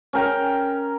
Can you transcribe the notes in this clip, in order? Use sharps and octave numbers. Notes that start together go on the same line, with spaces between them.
C#4 A#4 G5